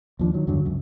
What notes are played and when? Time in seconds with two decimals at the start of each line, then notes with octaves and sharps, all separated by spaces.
0.19 D#2 F3 D4
0.34 D#3 F#3
0.47 E2 G2 D3 F#3
0.65 C#2 F#2